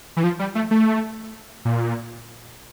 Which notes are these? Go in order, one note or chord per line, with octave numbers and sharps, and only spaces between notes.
E3
F3
G3
A3
A3
A#2